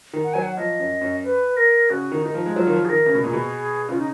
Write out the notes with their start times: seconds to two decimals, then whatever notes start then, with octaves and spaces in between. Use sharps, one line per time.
0.13 D#3
0.24 F#5
0.33 F#3 G#5
0.43 F#5
0.57 F3 D#5
0.79 F#2
1.01 F#2
1.23 B4
1.57 A#4
1.90 C#3 F#4
2.12 D#3
2.22 D#3 D#4
2.34 F3
2.46 G#3
2.56 F#3 F4
2.67 D#3
2.72 F3
2.85 G#4
2.89 D#3 A#4
3.06 C#3
3.15 B2
3.22 A#2 G#4
3.33 B2
3.89 C#3 F4
3.98 D#4